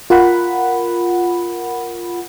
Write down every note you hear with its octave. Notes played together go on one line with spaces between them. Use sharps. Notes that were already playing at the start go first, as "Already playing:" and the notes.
F4 A#4 F#5 B5